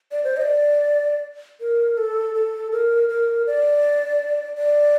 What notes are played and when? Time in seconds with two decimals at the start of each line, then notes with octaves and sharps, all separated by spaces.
0.12 D5
0.24 C5
0.37 D#5
0.42 D5
1.61 A#4
1.98 A4
2.35 A4
2.72 A#4
3.09 A#4
3.47 D5
4.58 D5